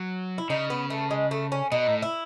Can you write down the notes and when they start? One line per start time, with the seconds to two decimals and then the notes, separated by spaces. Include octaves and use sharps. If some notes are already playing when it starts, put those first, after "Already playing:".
Already playing: F#3
0.38 E4
0.50 C#3 D#4
0.70 B3
0.90 A3
1.11 G#3
1.31 A3
1.52 C#4
1.72 B2 D#4
1.87 A2
2.02 E4